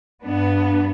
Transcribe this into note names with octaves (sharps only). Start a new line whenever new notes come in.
G2 B3 D4